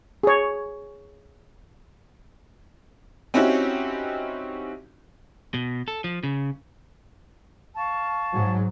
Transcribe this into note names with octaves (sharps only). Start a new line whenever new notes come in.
G#4 C#5
C4 C#4 D#4 E4 F#4 G4
B2
A4
F3
C#3
F5 A5 C#6
G#2 F#3